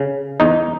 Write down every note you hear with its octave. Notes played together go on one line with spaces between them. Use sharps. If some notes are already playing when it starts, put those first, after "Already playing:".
Already playing: C#3
E2 D#4